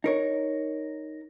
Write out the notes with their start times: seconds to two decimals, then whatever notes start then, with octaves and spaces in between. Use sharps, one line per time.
0.04 D#4 A#4 C#5